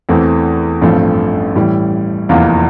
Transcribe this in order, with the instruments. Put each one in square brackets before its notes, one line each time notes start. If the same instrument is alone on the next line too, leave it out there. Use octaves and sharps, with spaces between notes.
[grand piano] E2 E3 A3 C4
A1 G2 F3 A3 C4
A2 E3 G3
F1 E2 E3 A#3 F4